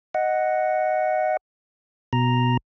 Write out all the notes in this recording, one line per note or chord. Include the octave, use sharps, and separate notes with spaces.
D#5 F#5
B2 A#5